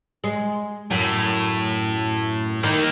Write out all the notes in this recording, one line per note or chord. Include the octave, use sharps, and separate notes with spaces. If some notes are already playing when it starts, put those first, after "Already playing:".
G#3
F#2 A2
D#3 A#3 D#4